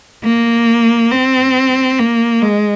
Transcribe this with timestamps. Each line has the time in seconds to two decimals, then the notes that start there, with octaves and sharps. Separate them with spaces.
0.24 A#3
1.12 C4
1.99 A#3
2.42 G#3